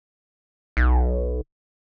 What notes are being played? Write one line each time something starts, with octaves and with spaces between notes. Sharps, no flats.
B1